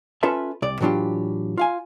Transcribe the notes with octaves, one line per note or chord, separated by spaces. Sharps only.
C#4 F4 A4 B4 E5 A5
C2 D5
A2 E3 F#3 D4 F4 G4
F4 F5 G#5